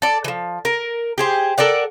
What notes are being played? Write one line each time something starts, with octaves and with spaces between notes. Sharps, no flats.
A4 D5
E3 F3
A#4
G4 G#4 C5
A4 A#4 D5 F#5